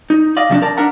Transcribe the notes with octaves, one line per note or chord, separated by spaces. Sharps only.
D#4
D5 D#5 F5
C3 F3 C#4 D4
A#4 D5 A5
D4 A#4 E5 F#5 A#5